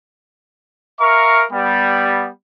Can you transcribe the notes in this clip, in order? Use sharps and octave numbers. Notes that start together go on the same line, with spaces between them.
A#4 E5 F5 A#5 C#6
G3 B3